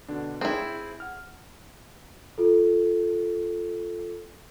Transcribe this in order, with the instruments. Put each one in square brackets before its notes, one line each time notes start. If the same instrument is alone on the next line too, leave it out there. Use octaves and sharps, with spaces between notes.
[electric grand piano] B2 D3 D4
[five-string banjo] C4 E4 [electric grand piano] G#4
[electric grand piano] F#5 F6
[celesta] F4 A4